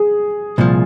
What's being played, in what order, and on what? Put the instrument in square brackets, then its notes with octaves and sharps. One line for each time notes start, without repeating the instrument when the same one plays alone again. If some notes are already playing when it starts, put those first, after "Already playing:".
Already playing: [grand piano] G#4
[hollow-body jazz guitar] C2 A#2 F3